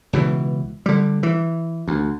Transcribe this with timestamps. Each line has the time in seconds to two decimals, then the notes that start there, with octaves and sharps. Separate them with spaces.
0.13 C#2 B2 E3
0.86 D3 G3
1.23 E3
1.88 D2